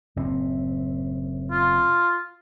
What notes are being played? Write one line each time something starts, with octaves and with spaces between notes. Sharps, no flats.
F#1 A2 C4
F4